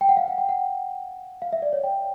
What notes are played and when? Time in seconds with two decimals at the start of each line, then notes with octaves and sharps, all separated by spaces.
0.01 G5
0.09 F#5
0.17 F5
0.28 F#5
0.38 G5
0.49 F#5
1.42 F5
1.53 E5
1.62 D5
1.73 C#5
1.84 G5